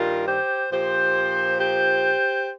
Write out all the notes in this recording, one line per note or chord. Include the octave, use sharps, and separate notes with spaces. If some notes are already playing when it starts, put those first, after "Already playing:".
Already playing: G2 D#3 G3 F4 A#4
G4 C5
A#2 F3 G4 C5
G4 C5